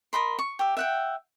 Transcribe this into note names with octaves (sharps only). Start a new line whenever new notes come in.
A#4 D#5 B5 C6
C#6
G4 E5
E5 F#5 G5